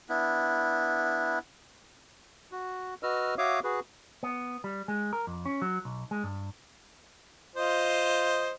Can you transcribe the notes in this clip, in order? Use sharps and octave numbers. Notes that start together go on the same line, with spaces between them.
B3 D4 E4
F#4
F#4 B4 D#5 E6 F6
F#4 C#5 E5 F5 D6 D#6
F#4 G#4 B4
B3
G3
G#3
A#4
F2
C#4
F#3
B1
G#3
G2
F4 C5 D#5